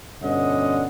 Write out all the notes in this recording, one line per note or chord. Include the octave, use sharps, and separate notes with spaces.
G2 B2 D3 C#4 D#5 F#5